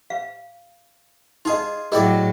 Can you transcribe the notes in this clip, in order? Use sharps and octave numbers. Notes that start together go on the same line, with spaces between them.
F5
D#4 F4 G#4 D#5
A2 F#3 E4 G4 G#4 D5 D#5